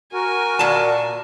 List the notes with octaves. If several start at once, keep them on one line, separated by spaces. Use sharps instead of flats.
F#4 A#4 G#5
A#2 D5 A5